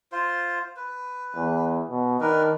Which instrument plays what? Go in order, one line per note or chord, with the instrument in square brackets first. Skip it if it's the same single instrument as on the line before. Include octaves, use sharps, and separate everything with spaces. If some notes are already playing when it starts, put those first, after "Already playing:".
[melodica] F4 C5
B4
[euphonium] E2
B2
[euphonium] D#3 [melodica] D4 A#4 B4